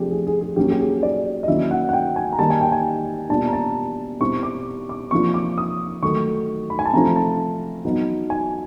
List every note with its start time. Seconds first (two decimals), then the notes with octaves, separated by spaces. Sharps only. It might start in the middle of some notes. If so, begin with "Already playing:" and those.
Already playing: C3 F3 A3 D4 G4 G#4
0.11 G#4
0.27 G#4
0.41 G#4
0.56 F#3 A#3 C#4 G4
0.71 G4
0.80 G#4
1.03 D5
1.43 D#5
1.48 D#3 F#3 A#3 C#4 E4 E5
1.71 F#5
1.89 F#5
1.93 G5
2.16 G#5
2.33 A#5
2.38 D#3 G3 A#3 A5
2.50 G#5
2.61 G5
2.72 G#5
3.29 B2 G3 A#3 D4 F4 A5
3.48 A#5
3.53 A5
4.20 B2 G3 C4 E4 C#6
4.43 D6
4.89 D6
5.11 C3 F3 A#3 D4 F4 C#6
5.34 D6
5.58 D#6
6.02 D#3 F#3 A3 C#6
6.70 B5
6.79 G#5
6.86 A5
6.93 C3 F3 A3 C4 F4 A#5
7.16 A5
7.85 F#3 B3 D#4
8.30 G#5